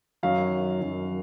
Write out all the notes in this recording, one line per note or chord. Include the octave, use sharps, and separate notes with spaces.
F#2 D#3 F#3 F5
F#2 D#3 F#3